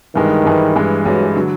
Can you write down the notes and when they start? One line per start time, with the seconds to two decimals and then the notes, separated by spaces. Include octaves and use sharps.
0.15 G2 D#3 E3 G#3
0.45 G2 E3 G#3
0.76 G2 E3 G#3
1.06 G2 E3 F#3 G#3
1.36 D3 F#3